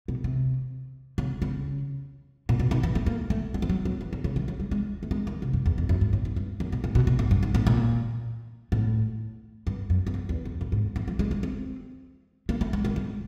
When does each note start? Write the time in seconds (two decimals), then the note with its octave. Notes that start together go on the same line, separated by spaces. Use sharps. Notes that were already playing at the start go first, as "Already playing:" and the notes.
0.08 B2
0.24 C3
1.18 C#3
1.42 C#3
2.49 A#2
2.59 B2
2.71 D#3
2.83 E3
2.95 A3
3.06 A#3
3.30 A3
3.54 G#3
3.62 F3
3.69 F#3
3.85 F#3
4.01 E3
4.13 D3
4.24 C#3
4.36 E3
4.48 F#3
4.60 G3
4.71 G#3
5.03 A3
5.11 G#3
5.27 D#3
5.42 C3
5.53 G2
5.66 E2
5.78 F2
5.89 F#2
6.01 G#2
6.13 A2
6.25 G#2
6.36 G2
6.60 F#2
6.72 A#2
6.84 A2
6.95 B2
7.07 A#2
7.19 A2
7.31 G2
7.43 G#2
7.55 A2
7.67 A#2
8.72 A2
9.67 G2
9.90 F#2
10.07 E2
10.14 F2
10.29 E2
10.45 F2
10.61 F#2
10.72 G#2
10.96 E3
11.08 F3
11.19 G#3
11.31 C4
11.43 C4
12.49 A#3
12.61 A3
12.73 G#3
12.85 D#3
12.96 G3